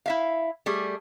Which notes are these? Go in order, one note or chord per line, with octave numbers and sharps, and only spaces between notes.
E4 E5 F5
G3 A3 G#4